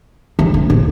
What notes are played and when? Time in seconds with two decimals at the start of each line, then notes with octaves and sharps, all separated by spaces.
0.39 D3
0.54 C3
0.70 B2